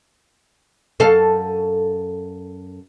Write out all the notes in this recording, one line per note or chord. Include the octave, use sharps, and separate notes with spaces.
F#2 A4 F5